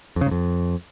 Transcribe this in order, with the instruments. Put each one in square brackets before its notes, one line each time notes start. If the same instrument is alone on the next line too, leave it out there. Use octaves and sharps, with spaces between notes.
[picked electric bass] F2
C#3
G#2
F2